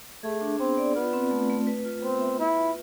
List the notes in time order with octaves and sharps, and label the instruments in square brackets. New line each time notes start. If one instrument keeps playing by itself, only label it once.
[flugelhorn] A3 [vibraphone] G#4
[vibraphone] D4
[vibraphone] B3 [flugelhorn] C4
[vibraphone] D5
[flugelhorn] B3 [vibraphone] F4
[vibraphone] C4
A3
A3
B4
F4
[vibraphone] B3 [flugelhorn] C4
[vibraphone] E5
[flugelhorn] E4 [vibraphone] B4
[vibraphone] F4